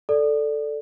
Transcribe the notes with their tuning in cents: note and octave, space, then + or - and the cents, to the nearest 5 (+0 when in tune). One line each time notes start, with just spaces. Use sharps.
A4 +0 D5 +0